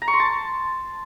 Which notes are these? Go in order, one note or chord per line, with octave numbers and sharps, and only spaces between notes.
A#5
C#6
C6
A5